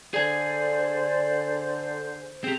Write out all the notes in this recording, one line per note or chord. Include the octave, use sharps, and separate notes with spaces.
D3 G#4 C5 D5 G#5
C4 G4 G#4